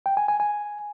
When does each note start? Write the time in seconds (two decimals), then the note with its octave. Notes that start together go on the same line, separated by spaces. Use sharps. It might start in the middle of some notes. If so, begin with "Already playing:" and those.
0.06 G5
0.17 G#5
0.28 G#5
0.40 G#5